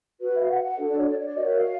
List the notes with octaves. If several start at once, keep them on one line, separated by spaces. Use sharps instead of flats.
F#4 B4
E5
F5
F#5
F#5
D4 F#4 A4
D5
C#5
D5
C#5
D5
F#4 A#4 C#5 D#5
E5
F5